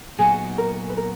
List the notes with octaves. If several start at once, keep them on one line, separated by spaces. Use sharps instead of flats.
A#2 F#3 B3 D#4 F#4 G#4
A#4
B4
A#4